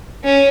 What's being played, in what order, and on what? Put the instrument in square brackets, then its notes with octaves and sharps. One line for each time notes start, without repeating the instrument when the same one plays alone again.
[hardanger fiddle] C#4